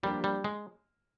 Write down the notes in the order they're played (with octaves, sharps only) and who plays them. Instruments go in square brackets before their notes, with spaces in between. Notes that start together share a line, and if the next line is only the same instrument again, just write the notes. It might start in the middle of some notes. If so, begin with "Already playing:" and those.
[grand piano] F3 A#3 D4 G4 [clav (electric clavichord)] G3
[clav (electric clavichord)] G3
G#3